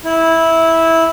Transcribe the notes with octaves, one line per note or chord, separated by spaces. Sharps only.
E4